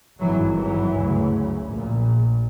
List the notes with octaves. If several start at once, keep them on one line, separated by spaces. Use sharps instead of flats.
G#1 G2 E3 F#3
E3 F#3
D2 C#3
A#1 A#2